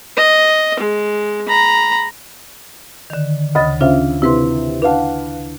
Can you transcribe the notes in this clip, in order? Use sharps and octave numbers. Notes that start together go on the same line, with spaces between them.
D#5
G#3
A#5 B5
D3 D#3
D2 C#3 D#5 B5 A6
C#3 D4 F4 C5 E5 F5
C3 E4 B4 C6
D4 B4 F5 F#5 A5